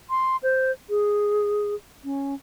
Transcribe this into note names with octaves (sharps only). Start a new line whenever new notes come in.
C6
C5
G#4
C#4